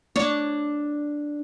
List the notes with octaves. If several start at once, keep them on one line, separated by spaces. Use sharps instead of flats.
D4 C#5